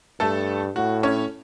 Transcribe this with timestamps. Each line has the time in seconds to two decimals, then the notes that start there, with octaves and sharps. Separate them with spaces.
0.20 G2 A3 A4
0.76 A2 F#4
1.03 C#4 C#5